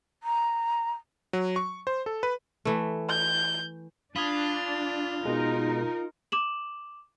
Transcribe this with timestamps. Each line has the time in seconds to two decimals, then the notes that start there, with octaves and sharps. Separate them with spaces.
0.23 A#5
1.33 F#3
1.56 C#6
1.87 C5
2.06 A4
2.23 B4
2.65 E3 A3
3.10 G6
4.16 D4 F4 B5 D#6 G#6
5.25 B2 G#3 D#4 A#4
6.32 D6 E7 F#7